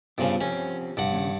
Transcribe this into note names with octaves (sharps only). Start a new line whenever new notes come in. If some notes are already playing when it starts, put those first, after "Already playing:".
G2 C#3 B3 F4 C5
F3 C4 C#4 G4
G2 F#5
D#2 A#2 C#3